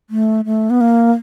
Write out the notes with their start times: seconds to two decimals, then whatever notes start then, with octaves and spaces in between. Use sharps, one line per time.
0.10 A3
0.45 A3
0.70 B3
0.81 A#3